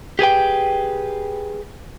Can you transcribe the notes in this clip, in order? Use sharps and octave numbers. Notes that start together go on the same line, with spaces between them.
G4 G#4 B4 G5